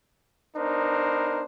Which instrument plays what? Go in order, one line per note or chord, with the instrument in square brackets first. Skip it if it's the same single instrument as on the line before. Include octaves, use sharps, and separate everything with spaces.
[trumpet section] B3 D4 D#4 A#4 C5